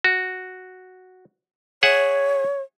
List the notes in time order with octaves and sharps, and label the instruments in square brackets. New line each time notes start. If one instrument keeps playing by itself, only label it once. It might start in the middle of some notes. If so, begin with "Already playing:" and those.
[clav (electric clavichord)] F#4
[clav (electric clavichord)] G#4 E5 F#5 [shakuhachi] C#5